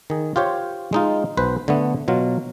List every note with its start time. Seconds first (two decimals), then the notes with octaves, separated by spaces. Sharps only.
0.10 D#3 G#4
0.36 F4 G4 C5 C#5
0.93 G#3 D#4 F4
1.37 B1 B4 C5
1.68 D3 A3 B3
2.08 B2 F#3 F4